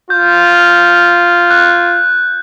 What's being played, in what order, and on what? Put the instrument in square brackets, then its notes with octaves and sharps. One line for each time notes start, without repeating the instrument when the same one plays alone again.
[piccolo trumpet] F4 [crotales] G6
[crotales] F#6